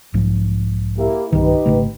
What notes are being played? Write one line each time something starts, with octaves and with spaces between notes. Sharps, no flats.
B1 G#2 F3
A#3 E4 G4
B1 G2 D#3 D#4 G4 B4
G#1 C#3 A3